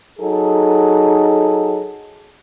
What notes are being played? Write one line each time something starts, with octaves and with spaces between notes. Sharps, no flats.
F#3 D#4 G#4 A4